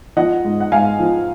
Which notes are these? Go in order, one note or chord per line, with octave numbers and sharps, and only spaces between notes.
F3 D#5 F#5
G#2
F#5
G#2 F5 G#5
F3